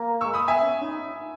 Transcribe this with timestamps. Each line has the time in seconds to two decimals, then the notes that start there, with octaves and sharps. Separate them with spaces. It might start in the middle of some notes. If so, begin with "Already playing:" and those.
Already playing: A#3
0.21 C#6 E6
0.25 G#3
0.34 A#3 B5 D#6
0.48 B3 E5 G#5
0.61 C#4
0.81 D#4